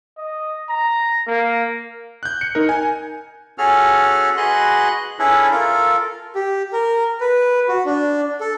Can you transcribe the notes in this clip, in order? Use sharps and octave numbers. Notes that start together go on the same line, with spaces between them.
D#5
A#5
A#3
F#6 G6
C#7
D#4 A#4
G#5
C#4 F#4 G#4 A4 F6
F#4 G#4 B4 D#5 C6 F#6
C#4 D4 E4 G#4 A4 B4
F4 A4 A#4
G4
A#4
B4
F#4
D4
A4